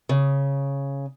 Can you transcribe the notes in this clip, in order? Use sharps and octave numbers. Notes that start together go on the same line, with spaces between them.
C#3